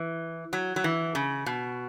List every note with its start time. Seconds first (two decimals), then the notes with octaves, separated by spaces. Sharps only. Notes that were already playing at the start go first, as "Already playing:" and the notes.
Already playing: E3
0.53 F#3
0.76 F#3
0.84 E3
1.15 C#3
1.46 B2